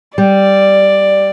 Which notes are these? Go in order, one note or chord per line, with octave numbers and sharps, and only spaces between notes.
G3 D5